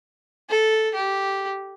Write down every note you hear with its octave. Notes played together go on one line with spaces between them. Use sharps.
A4
G4